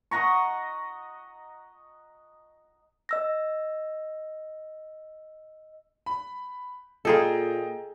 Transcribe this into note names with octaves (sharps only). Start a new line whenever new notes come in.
D#5 F#5 A#5 C#6
D#5 E6 A#6
B5
A#2 F4 G#4 A4 D#5 G5 A#5